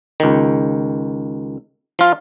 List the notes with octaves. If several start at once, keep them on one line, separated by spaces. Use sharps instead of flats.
C#2 D#3
F3 F4